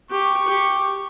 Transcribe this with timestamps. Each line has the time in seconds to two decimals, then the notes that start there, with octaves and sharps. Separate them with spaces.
0.11 G4 C#6
0.47 G4